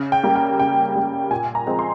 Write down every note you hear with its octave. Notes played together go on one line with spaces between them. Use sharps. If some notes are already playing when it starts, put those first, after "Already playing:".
Already playing: C#3
G5
G3 A#3
G5
C#3 G5
G3 A#3
A#2 G#5
A#5
F3 G#3 C4
C6